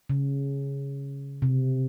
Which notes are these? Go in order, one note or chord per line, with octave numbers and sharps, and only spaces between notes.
C#3
C3